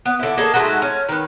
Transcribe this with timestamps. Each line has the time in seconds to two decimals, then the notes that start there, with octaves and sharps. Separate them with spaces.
0.06 B3
0.19 D3 E4
0.37 A#3 G#4 A4 D#5
0.54 G#3 A3 D#4 F#4
0.82 C#4
1.09 D#3 B4